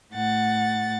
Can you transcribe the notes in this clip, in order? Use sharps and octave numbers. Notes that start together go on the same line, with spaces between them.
A2 F#5 A6